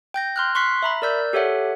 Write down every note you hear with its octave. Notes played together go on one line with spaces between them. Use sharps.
G5 G6 A#6
C6 F6 F#6
C6 C#6 F#6 B6 C7
E5 A#5 B5
A#4 D5 E6 G6
G4 A4 C#5 E5 F#5